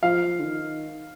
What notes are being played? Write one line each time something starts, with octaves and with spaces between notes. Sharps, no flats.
F3 F5
D3
D#3